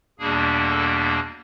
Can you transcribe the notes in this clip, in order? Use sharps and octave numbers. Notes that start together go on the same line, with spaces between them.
E2 B2 G3 A#3 D4 G#4
A4